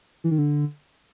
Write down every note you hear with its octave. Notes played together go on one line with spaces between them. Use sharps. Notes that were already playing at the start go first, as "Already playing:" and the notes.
E3
D#3
D3